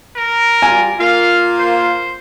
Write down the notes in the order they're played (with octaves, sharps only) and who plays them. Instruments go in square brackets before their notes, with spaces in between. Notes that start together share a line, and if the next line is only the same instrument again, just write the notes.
[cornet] A#4
[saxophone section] G3 F4 [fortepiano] G#5
[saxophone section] A#3 F4 [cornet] F5
[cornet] C5